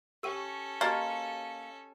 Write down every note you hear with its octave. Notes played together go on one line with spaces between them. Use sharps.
C#4 G4 A4 G5 E6 D#7
A#3 F#4 G4 D#5 A5 F6 A6